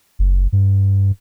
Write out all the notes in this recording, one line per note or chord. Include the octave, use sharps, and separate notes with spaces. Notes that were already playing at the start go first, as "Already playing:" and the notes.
F#1
G2